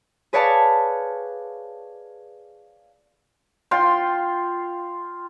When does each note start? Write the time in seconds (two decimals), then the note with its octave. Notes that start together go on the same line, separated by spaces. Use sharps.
0.33 G#4 B4 C#5 D5 F5 A5
3.71 F4 G5 C6